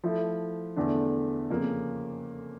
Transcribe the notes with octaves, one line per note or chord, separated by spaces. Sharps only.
F3 A3 E4
E2 D3 A3 D4
F2 C#3 F3 A#3